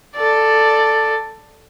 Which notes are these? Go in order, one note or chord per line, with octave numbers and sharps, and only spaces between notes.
A4 D5